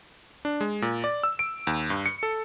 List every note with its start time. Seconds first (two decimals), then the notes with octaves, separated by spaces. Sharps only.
0.45 D4
0.61 G#3
0.82 A#2
1.04 D5
1.23 E6
1.39 D7
1.67 D#2
1.90 G2
2.06 C#7
2.23 A4